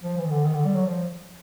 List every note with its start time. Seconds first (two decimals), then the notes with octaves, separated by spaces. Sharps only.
0.03 F3
0.17 E3
0.25 D#3
0.31 D3
0.45 D#3
0.54 D3
0.65 G3
0.75 F#3
0.86 F3